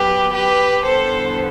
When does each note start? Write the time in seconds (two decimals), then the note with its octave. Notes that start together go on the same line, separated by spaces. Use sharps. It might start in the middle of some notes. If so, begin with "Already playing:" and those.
Already playing: F#2 F#3 B3 G4 B4
0.32 G4 B4
0.85 E2 D3 G3 B3 A4 C5